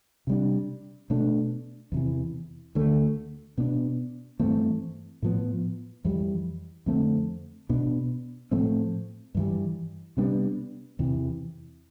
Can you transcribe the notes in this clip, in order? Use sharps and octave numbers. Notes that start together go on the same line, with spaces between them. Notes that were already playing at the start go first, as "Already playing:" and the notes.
C3 G3 D4
B2 A3 D4
E2 C3 E3
D2 D3 A3
B2 B3 D4
G2 E3 A3 C4
A2 F3 B3
F2 E3 G3
F2 D3 A3 C4
B2 B3 D4
A2 F3 A3 C4
G2 E3 G3
C3 G3 B3 D4
E2 C3 E3